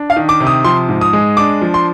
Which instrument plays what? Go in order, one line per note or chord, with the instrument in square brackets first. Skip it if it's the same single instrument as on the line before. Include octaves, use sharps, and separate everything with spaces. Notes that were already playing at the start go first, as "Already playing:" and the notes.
Already playing: [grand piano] D4
F5
D#3
D6
C3
D#6
F3 C6
G#2
D#6
G#3
D4 D6
F3
C6